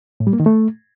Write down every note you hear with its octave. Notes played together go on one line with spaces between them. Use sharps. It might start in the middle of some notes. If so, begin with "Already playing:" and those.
A2
G3
A#3
D#3
A3